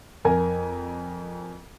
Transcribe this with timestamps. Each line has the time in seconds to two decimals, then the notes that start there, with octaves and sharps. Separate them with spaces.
0.25 F2 A#4 G#5